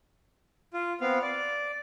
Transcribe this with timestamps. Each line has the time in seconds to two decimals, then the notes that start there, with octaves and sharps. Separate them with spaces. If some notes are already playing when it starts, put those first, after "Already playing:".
0.74 F4
1.01 B3 C4 F5
1.22 D5